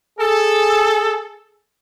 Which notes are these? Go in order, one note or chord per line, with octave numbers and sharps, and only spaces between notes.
G#4 A4